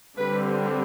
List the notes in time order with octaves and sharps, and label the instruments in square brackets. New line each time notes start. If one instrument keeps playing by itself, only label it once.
[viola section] D3 G3 C4 B4